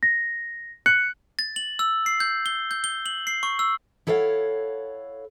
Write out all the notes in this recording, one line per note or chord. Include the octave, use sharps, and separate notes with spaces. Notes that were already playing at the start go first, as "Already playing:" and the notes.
A#6
F#6 C#7
A6
F#7
E6
C7
G6
G7
G6
G7
F#7
C7
C#6
E6
E4 A4 C#5 D5 F5 F#5